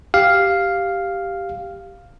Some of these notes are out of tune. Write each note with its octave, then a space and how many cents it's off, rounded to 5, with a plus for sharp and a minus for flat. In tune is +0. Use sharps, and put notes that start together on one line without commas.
G4 +0 F5 +0